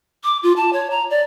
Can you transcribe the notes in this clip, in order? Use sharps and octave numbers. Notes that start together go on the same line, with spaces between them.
D6
F4
A5
C#5
A#5
D5